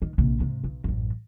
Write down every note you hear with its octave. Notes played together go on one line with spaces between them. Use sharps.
D#3
A#1 C3
G#2 C3
B1
A1 F#2